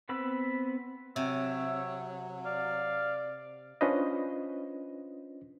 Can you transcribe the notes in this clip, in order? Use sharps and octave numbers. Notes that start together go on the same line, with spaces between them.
B3 C4 B4 B5 E6
C3 F#3 C#5 E5
D5 F5
C#4 D4 F4 B4 C5 D#5